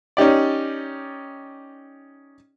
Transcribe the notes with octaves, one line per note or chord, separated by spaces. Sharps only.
C#4 D#4 G4 D5